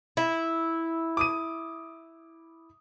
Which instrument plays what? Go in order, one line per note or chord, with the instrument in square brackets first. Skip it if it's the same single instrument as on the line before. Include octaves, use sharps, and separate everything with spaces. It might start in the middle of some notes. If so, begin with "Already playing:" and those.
[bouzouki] E4
[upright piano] D6 D#6 D#7